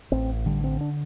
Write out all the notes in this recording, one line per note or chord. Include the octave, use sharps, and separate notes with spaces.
A1 C4
D3 G3
C4
D4